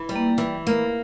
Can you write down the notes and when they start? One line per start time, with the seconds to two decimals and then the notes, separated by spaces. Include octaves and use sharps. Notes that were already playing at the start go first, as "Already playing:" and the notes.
Already playing: E3
0.09 G3
0.16 A#3
0.38 E3
0.67 A#3